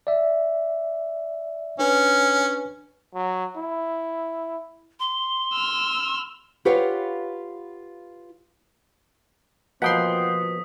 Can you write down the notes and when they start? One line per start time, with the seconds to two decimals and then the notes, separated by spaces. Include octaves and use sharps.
0.07 D5 E5
1.79 C#4 D4 B4
3.14 F#3
3.57 E4
5.00 C6
5.53 E6 F6
6.65 F4 G4 B4 C#5 F5 F#5
9.82 B2 F3 A#3 F#5 G5 C6 D#6 B6